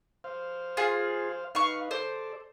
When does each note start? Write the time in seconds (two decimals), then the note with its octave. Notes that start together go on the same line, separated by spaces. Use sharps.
0.24 C5 F5
0.77 F4 G#4
1.55 D#4 B4 F5 C#6
1.91 A4 C5 D5